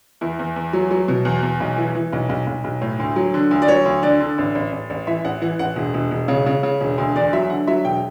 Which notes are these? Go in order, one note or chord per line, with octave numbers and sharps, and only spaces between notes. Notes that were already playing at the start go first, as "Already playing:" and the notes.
E2 E4
E2
E2
F#3
F#3
B2
E2
E2
B1
E3
E3
B1
B1
B1
B1
A2
D2
F#3
D3
D2
D5
F#3 C#5
D2
D3 D5
D3
A1
A1
A1
A1
E3 E5
A1 F#5
E3 F#5
A1 F#5
E1
E1
E1
C#3
C#3
C#3
E1
D2
E2 D5
F#3 E5
D3 F#5
F#3 E5
E1 G5